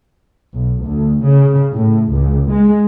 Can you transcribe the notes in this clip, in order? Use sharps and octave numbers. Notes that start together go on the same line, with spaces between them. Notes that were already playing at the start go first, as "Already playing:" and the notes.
B1
D2
C#3
A2
C#2
G#3